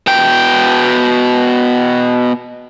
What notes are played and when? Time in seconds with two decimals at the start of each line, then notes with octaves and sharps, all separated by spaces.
0.07 B2 G5